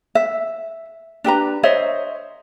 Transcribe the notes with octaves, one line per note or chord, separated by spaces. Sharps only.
E5
D4 G4 B4 A#5
C5 C#5 D#5 E5